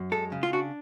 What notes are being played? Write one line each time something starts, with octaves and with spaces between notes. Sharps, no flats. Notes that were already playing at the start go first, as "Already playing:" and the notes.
Already playing: F#2
G#3 A4
C#3
F4
D4 F#4